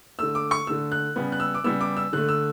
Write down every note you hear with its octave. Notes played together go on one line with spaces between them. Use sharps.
D3 A3 E6
D6
C#6
D3 A3 E6
F#6
C#3 G3 B3
F#6
E6
D6
C#3 G3 B3 E6
D6
E6
D3 A3 F#6
E6